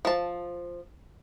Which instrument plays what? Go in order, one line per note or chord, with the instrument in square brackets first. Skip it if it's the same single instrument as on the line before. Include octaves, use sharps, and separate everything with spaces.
[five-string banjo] F3 A5